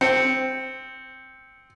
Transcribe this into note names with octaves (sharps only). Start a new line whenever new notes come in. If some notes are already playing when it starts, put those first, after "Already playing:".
C4 C#7